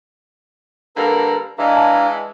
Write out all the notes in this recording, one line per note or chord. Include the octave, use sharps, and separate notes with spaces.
D3 G3 A#3 A4 B4 A#5
E3 G#3 D4 F5 A#5
A5